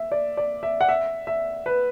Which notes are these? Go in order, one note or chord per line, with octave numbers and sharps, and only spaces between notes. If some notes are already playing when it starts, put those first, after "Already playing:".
Already playing: E5
D5
D5
E5
F#5
E5
E5
B4